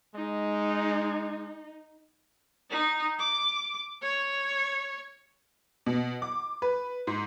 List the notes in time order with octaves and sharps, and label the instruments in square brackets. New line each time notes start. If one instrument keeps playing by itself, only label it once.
[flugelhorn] G#3 [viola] D#4
[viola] D#4
D6
C#5
[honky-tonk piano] B2
D6
B4
G#2